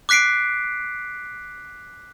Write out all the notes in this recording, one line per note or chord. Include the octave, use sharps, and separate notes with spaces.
D6 F#6 B6 C7 D7